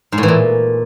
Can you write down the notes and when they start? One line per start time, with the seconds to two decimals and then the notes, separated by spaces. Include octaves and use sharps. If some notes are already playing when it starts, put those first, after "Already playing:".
0.12 G#2
0.18 A2
0.23 E3
0.28 A#2